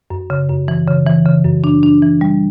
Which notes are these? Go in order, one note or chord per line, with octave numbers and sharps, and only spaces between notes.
F#2
C#3
F#2
E3
C#3
E3
C#3
F#2
D4
D4
E3
G3